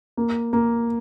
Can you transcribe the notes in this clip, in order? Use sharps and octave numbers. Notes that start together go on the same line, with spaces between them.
A#3
A#3